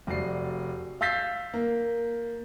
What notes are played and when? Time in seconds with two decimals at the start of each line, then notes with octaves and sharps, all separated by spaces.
0.07 F1 F#4 D5 C7
1.01 F5 E6 G6 A6 B6 C7
1.54 A#3